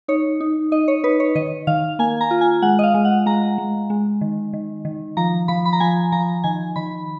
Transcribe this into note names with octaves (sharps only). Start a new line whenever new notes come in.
D#4 C#5
D#4
D#4 D#5
C#5
D#4 B4
C#5
D#3 D#5
D#3 F5
A#3 G#5
A#5
F4
G#5
G#3 F#5
D#5
F5
G#3
F#5
G#3 A#5
G#3
G#3
D#3
D#3
D#3
F3 A#5
F3 B5
B5
A#5
F3 G#5
F3 A#5
D#3 G#5
D#3 B5